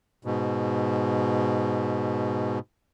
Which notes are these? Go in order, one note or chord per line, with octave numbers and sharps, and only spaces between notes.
G#2 B2